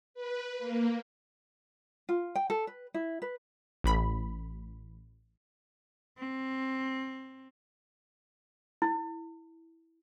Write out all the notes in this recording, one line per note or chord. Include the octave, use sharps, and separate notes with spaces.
B4
A#3
F4
G5
A4
B4
E4
B4
A1 B5
C4
E4